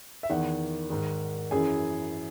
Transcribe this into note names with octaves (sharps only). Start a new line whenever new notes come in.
E5
E2 D#3 F#5
G#2 D#3
F#2 E3 G#4 G#5